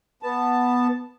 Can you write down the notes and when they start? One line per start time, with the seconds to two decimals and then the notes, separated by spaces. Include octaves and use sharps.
0.23 B3 A5